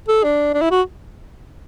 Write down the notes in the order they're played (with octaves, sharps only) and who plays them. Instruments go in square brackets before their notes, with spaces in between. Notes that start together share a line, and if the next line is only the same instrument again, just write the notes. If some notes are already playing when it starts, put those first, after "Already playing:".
[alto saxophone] A4
D4
D4
E4
F#4